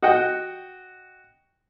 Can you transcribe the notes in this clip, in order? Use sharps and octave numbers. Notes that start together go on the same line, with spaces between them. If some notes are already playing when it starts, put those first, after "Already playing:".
F#4 D#5 F#5 G5